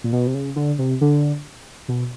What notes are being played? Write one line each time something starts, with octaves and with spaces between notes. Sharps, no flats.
A#2
B2
C3
C#3
D3
C3
D3
B2